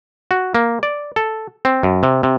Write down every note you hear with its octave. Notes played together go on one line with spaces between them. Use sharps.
F#4
A#3
D5
A4
C4
F#2
C3
C3